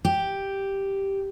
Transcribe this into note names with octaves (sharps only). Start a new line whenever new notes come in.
G4